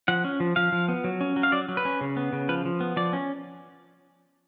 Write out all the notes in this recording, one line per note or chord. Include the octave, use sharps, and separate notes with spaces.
F3 F#5
C#4
F3
F3 F5
F3
B3
F#3
C#4
F#3
F5
F#3 D5
F#3
B4
C#4
C#3
B3
C#3
F3 B4
F3
B3
F3 D5
C#4